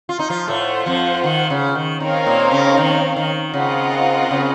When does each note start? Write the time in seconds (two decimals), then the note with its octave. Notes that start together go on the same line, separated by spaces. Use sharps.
0.09 F4
0.19 D#4
0.30 F3 F4
0.47 A2 A3 F4 C5 F#5
0.86 F2 F3
1.24 D#3
1.50 C#3
1.75 D#3
2.00 D#3 C4 D#4 A#4 C#5 F5
2.26 A#2 A#3
2.51 C#3 C#4
2.77 D#3
3.16 D#3
3.54 C#3 C4 F4 A#4 D#5 F#5
4.31 C#3